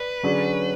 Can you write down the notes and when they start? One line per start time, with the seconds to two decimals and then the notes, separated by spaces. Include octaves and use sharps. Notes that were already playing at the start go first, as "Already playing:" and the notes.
Already playing: B4 D5
0.23 D3 F#3 C#4 G#4 D5